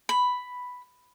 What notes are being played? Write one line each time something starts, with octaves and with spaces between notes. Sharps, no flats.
B5